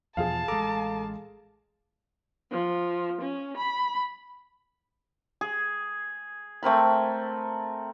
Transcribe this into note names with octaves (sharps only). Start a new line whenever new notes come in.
E2 B2 F3 G#4 F5 A5
A1 G#3 A4 A#5 D6
F3
C#4
B5
G#4
A3 C4 A#4 B5